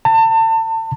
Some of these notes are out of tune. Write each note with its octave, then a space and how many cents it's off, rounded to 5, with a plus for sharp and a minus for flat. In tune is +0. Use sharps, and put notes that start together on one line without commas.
A5 +35